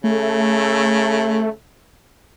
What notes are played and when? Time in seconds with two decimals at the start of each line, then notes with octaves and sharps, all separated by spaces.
0.04 C#3 A3